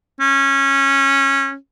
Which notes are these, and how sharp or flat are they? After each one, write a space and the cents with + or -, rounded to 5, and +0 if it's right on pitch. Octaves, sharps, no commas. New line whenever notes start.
C#4 -15